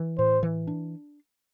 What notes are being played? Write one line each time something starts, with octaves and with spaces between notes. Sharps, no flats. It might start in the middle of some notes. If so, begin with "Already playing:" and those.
Already playing: E3
A2 C5
E3
D4